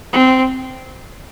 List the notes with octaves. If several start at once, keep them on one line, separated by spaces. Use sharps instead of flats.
C4